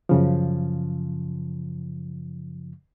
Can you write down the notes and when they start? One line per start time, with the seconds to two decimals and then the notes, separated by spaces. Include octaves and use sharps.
0.09 F#2 C#3 F3